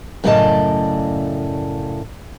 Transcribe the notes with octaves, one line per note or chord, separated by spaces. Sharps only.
F#2 A2 C#3 D5 D#5 A5